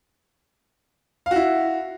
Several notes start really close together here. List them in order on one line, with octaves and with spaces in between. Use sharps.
F5 F#4 E4